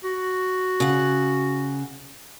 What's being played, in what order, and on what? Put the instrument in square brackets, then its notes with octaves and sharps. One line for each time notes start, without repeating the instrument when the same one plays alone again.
[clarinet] F#4
[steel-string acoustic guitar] C#3 F#5